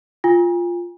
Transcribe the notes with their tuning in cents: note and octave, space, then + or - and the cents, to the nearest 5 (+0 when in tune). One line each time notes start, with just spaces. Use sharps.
F4 +0 G#5 -40